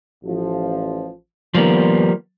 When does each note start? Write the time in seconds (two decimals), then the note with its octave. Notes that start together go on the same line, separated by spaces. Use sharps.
0.24 A1 F3
1.55 D#3 F3 G3 A#3 B3